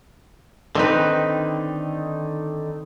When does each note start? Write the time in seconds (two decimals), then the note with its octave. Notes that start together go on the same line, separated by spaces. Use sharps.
0.75 D3 D#3 C4 D#4 B4